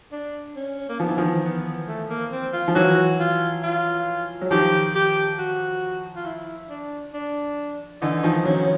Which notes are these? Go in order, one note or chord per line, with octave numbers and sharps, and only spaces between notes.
D4
C#4
A#3
F3 B3
E3
D#3 F3
B3
A3
A#3
C4
F4
F3
E3 F#3 F#4
F4
F4
F#3
D#3 F3 G4
G4
F#4
F4
E4
D4
D4
D3 E3 D#4
D#3 F3
E3 F#3 C#4